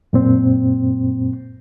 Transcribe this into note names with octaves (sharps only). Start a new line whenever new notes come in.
F#2 A#2 C4